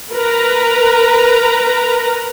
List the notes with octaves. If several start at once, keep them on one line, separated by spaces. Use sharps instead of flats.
A#4 B4 A#5